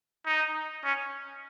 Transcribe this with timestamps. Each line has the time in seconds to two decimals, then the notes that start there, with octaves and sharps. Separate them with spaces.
0.26 D#4
0.84 C#4